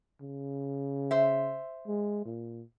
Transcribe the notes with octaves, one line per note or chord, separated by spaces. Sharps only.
C#3
C5 E5
G#3
A#2